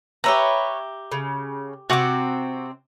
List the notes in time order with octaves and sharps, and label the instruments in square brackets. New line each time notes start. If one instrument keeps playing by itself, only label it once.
[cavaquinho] G4 E5 A#5 [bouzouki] B4 C#5
[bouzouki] C#3
[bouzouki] C3 C4 [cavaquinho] F#4 F#5 D6